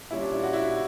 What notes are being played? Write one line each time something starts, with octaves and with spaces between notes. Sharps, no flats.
A#2 G3 C#4 E4
D4
E4
F#4
E4